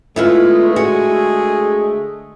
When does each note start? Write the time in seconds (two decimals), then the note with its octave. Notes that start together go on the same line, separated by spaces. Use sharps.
0.16 D3 G#3 A3 B3 E4 F4
0.76 F#4 G#4